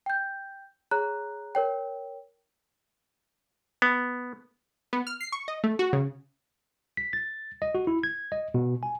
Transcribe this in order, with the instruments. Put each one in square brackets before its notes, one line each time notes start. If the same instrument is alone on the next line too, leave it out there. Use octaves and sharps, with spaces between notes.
[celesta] G5 G6
G#4 C#5 A#5 F#6
A#4 C#5 G5
[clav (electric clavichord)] B3
[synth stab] B3
F6
C7
C#6
D#5
A3
F#4
C#3
[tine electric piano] B6
A6
D#5
F#4
E4
G#6
D#5
B2
G#5